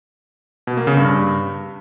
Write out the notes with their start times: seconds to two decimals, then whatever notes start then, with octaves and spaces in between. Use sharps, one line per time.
0.67 B2
0.77 A#3
0.87 C#3
0.97 G2